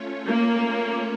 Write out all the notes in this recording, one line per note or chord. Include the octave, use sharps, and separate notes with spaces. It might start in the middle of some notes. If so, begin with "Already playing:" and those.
Already playing: A3 C#4 F4 C#5
A#3